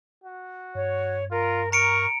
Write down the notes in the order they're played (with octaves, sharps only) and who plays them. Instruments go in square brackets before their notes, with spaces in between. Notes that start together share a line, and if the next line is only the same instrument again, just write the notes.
[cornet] F#4
[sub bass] G2 [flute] C#5
[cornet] F4 [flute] A#4
[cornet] A#4 [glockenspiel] A#5 C#7 D7 [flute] C#6